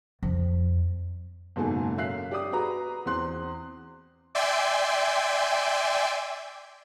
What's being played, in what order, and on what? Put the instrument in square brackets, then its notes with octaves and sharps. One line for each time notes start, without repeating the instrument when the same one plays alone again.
[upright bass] F2
[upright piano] F#1 G#2 B2 A4 G#5
F#2 E5 F5 F#6 C7
G4 D5 D6 D#6
F#4 G#4 B4 A#5
E2 C4 C6 F#6
[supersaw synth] D5 E5 G5 G#5 C6